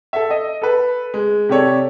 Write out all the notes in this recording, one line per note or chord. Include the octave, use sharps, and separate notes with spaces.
A4 E5
D#5
A4 B4
G#3
C3 G4 A4 C#5 D5